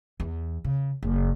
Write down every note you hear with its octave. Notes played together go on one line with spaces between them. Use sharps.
E2
C#3
F#1